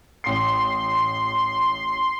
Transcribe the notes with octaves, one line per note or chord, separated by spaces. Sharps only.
A1 C6 C7